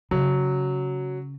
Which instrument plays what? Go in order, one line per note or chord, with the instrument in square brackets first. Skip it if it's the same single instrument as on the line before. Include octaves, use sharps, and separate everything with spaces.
[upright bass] C#3 [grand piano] F#3